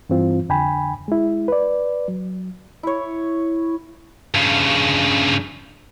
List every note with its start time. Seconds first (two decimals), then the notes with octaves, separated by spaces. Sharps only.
0.10 G2 E3 C4 F4
0.49 F2 D3 G5 G#5 B5
1.08 G#3 E4
1.48 B4 D5
2.08 F#3
2.83 E4 C#5
4.35 G2 C#3